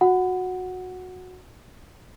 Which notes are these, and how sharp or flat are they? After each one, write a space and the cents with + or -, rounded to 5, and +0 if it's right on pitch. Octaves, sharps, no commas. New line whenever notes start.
F#4 -15 F#5 +0